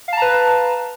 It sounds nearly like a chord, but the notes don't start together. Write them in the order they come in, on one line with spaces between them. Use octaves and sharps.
F5 A5 A#5 B4